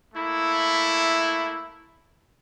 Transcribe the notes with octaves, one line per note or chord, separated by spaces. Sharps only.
A3 A#3 E4